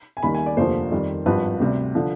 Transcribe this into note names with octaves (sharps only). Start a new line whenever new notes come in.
G#5
D#2 D#3 G3 B5
G#5
D5
F1 D#2 D3 F3 C5
F2 D#3 G3
G#1 G2 F3 B4
D2 C3 G3
D3 F3